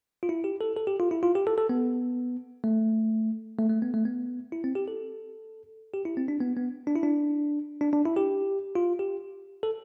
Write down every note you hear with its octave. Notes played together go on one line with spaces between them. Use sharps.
F4
E4
G4
A4
A4
G4
F4
E4
F4
G4
A4
A4
B3
A3
A3
A3
B3
A3
B3
E4
C4
G4
A4
G4
E4
C4
D4
B3
B3
D4
E4
D4
D4
D4
E4
G4
F4
G4
A4